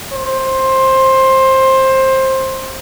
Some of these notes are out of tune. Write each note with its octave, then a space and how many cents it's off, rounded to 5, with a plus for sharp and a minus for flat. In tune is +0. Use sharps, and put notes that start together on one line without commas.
C5 +15